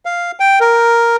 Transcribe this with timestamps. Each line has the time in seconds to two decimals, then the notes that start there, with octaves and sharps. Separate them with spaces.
0.05 F5
0.40 G5
0.60 A#4